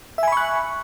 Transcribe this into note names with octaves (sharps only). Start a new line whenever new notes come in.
E5 G#5 B5 C#6 F#6